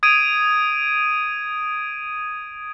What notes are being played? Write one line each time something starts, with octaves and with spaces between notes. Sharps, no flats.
D#6 G#6 D7 D#7